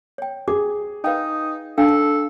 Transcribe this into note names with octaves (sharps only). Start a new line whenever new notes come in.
C#5 G5
G#4 D6
D#4 B4 F5 G5
D4 D#4 A4 F5